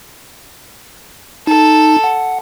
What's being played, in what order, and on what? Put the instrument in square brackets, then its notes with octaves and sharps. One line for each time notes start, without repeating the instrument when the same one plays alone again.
[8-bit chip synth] D#4 [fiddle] A4
[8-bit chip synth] F#5